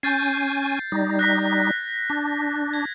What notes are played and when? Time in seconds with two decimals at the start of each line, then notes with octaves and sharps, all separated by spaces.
0.03 C#4 G#5 G6 A6 C7
0.92 G3 D#4
1.19 F#6 A#6 B6
2.10 D4
2.73 G#6